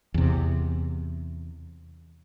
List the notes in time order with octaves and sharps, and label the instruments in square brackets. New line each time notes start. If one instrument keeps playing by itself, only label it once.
[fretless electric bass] E2 C3